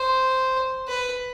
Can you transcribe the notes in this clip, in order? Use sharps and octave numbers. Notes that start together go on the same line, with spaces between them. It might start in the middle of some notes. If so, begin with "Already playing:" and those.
Already playing: C5
B4